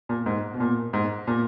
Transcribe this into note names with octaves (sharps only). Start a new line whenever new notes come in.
A#2
G#2
B2
A#2
G#2
A#2